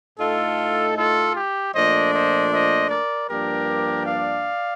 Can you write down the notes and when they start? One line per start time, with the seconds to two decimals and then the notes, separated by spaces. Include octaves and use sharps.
0.19 A2 A3 D#4 F4 A4
0.97 F4 A4
1.36 G4
1.74 A#2 F3 A3 D4 C5 D#5
2.13 C5 D#5
2.52 C5 D#5
2.90 A#4 D5
3.29 G2 F3 A#3 D4 G4 A#4
4.06 D5 F5